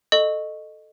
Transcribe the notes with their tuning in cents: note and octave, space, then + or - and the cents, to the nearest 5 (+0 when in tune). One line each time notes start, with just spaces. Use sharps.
A4 +0 D#5 -15 C#6 +0